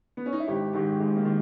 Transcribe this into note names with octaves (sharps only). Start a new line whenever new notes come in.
B3
C#4
D#4
E4
G#1 G4
G#2 D#3 G4
G#1 G#3
A#3
D#3